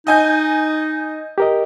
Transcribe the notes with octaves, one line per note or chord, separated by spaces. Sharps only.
D#4 D#5 G#5 G6
G4 A#4 D#5